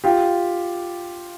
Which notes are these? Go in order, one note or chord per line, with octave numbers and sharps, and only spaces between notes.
F4 G4